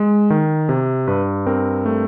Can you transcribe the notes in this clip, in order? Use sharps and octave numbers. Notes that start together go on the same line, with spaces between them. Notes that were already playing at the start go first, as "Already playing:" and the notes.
Already playing: G#3
D#3
C3
G2 B4
C4 A#4
A3